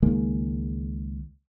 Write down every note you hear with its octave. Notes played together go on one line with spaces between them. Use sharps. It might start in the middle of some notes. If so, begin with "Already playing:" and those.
C#2 D#3 G#3 A#3